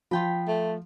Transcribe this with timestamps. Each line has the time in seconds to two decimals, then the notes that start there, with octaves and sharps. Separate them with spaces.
0.11 F3 F4 G5 B5
0.48 A3